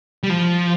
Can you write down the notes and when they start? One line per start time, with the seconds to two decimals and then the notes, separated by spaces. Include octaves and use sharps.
0.23 G3
0.30 F3